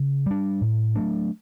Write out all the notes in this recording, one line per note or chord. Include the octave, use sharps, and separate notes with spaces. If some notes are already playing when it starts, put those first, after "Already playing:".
Already playing: C#3
G3 D4
A2
F#3 A3 D4